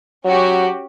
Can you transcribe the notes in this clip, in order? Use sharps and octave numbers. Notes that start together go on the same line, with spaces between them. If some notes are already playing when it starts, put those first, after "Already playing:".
F#3 C#4 F#4 G4